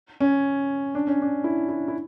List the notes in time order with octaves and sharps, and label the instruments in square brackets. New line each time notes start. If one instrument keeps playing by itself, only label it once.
[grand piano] C#4
D4
C#4
D4
E4
E4
E4